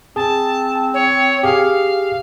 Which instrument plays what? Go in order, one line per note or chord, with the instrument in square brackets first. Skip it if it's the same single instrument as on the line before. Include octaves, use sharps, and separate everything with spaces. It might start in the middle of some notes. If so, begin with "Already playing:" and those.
[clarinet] C4 [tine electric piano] G#4 [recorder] A5
[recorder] C#5
[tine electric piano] G4 G#4 [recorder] F5